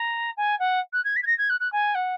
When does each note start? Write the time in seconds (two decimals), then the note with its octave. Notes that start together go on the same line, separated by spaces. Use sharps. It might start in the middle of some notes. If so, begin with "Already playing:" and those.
Already playing: A#5
0.37 G#5
0.59 F#5
0.93 F#6
1.04 G#6
1.16 B6
1.23 G#6
1.27 A#6
1.38 G#6
1.50 F#6
1.60 F#6
1.72 G#5
1.95 F#5